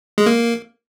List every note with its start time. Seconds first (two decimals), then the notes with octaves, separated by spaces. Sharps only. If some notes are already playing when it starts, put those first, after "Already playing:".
0.18 G#3
0.26 A#3